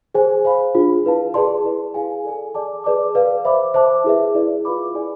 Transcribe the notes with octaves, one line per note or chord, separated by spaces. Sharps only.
G#4 C5 G#5
C5 F5 B5
D4 F4 G#4
E4 B4 F5 A5
G#4 B4 D5 A5 C6
E4 G#4 B4 D5
E4 G#4 D5 F5 G#5
A4 D5 G#5
G#4 D5 A5 D6
G#4 B4 D5 A5 D6
B4 D5 F5
C5 E5 B5 D6
C5 E5 A5 D6
E4 G#4 B4 E5
E4 G#4 B4 D5
F4 B4 F5 B5 D6
E4 G#4 D5 G#5